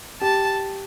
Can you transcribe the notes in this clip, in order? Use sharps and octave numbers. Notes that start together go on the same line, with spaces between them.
G4 A5